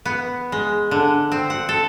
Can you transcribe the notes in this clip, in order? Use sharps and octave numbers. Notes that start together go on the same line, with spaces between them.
B3
G#3
D3
C4
F#5
A4